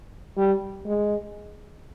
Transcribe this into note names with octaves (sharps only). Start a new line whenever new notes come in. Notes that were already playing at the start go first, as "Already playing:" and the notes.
G3
G#3